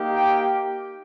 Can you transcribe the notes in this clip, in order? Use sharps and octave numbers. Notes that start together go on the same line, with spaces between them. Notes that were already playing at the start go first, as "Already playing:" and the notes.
Already playing: A#3 D#4 G4
G5